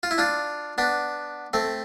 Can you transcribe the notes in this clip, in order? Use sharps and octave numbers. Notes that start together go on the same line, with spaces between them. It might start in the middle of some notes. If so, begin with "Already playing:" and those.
F4
E4
D4 F4
B3 D4
A3 C4